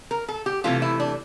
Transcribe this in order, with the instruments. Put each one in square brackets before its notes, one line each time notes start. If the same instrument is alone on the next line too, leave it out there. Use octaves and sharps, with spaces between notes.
[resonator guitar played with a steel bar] A#4
A4
G4
C3 E3 A3 F4
E4
D4